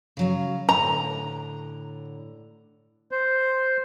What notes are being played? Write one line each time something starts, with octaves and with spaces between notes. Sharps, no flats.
C#3 F#3 F5
A2 D3 A#5
C5